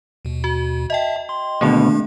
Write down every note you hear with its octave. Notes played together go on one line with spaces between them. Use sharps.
D#2 B2
F#4
D#5 E5 G5 A5
C6
D2 B2 D#3 A3 A#3 C4 D4 G#4